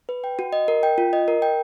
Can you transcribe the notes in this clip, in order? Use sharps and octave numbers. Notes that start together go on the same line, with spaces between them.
B4
G5
F#4
D#5
A#4
G5
F4
D#5
A#4
G5